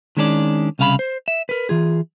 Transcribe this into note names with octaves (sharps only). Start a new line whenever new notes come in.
D#3 G#3 C#4 D4 A4 D5
C2 C#3 F5 A#5 B5
C5
E5
A#4 B4
E3 F4 G#4